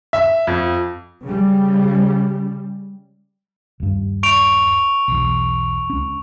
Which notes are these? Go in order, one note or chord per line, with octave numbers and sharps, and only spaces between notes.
E5
F2
C#3 G3
D#1 G2
C#6 D7 F7
B1 E2
C#2 C#4